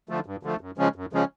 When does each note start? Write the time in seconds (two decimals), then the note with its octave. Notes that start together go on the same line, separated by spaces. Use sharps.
0.09 D3 F3 A3
0.26 G2
0.43 D3 F3 A3
0.61 F#2
0.78 C#3 F3 G#3 C#4
0.96 F#2
1.13 C#3 F3 G#3 C#4